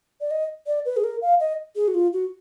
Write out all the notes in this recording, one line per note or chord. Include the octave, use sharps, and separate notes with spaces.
D5
D#5
D5
B4
G#4
A#4
F5
D#5
G#4
F#4
F4
F#4